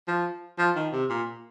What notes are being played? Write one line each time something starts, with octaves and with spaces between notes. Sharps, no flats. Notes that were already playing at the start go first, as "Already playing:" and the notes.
F3
F3
D#3
C3
A#2